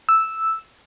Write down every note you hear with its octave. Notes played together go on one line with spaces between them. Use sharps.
E6